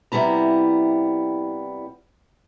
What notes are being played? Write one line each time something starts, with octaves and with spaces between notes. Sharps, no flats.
C3 G3 B3 E4 A#5